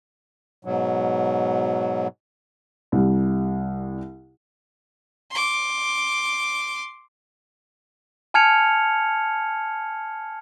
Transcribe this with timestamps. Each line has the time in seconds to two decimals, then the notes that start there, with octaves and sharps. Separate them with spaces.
0.65 G#2 B2 F#3
2.92 C2 G3
5.31 C6 D6
8.34 G#5 A5 F6 G#6 C#7 F7